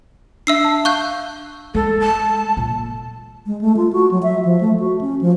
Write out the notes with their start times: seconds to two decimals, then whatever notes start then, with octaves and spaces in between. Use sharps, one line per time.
0.47 D4 E5 E6 C7
0.64 A5
0.85 F5 C#6 F#6 G6
1.75 G#3 A4
2.00 A5
2.57 A#2
3.46 G#3
3.61 A3
3.76 F4
3.92 F#4
4.11 F#3
4.23 E5
4.45 F3
4.60 A3
4.79 F#4
5.01 C#4
5.21 F3